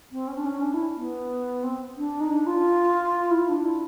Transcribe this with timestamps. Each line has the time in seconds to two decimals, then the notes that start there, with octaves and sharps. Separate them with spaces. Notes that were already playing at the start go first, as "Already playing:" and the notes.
0.12 C4
0.27 C#4
0.36 D4
0.45 C#4
0.61 D4
0.73 E4
0.96 B3
1.63 C4
1.97 D4
2.20 D#4
2.30 D4
2.46 F4
3.31 E4
3.48 D4
3.65 E4